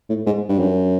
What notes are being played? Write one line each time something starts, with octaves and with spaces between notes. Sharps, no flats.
A2
G#2
G2
F#2